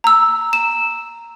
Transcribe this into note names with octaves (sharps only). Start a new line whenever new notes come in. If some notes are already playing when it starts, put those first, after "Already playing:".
A#5 E6
E7